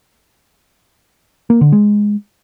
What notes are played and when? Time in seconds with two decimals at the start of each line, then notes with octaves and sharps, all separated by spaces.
1.50 A#3
1.61 D3
1.72 G#3